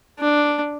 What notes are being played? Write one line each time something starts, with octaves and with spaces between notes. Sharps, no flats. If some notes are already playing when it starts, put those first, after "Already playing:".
D4